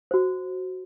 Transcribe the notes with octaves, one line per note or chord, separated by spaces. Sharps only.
F#4 C5